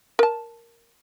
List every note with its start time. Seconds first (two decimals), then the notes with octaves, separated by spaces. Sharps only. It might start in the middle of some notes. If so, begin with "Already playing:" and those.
0.19 A#4 A5